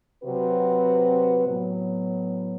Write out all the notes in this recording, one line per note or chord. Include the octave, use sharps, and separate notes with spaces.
C3 F#3 C4 F#4 B4
A2 F#3 B3